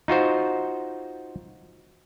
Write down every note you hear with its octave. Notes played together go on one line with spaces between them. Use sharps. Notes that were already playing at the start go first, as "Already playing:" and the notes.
D#4 F4 F#4 C5